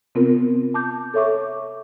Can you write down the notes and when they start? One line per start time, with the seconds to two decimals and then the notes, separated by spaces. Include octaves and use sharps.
0.15 C3 B3 C4 F4 A#4
0.74 A5 D6 G6
1.14 A4 C#5 E5 C#6 D6